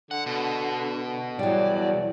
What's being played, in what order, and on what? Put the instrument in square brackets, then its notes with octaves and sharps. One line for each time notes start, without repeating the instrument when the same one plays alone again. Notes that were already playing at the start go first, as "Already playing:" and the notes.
[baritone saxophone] D3 [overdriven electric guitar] F#5
[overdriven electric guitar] B2
[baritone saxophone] E2 [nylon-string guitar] F#3 G3 [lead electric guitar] D5